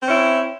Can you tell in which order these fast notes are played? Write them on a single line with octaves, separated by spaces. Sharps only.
C4 C#4 E4